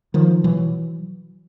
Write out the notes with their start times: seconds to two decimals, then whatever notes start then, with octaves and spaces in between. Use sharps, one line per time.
0.14 D#3 F3
0.44 B2 E3 F#3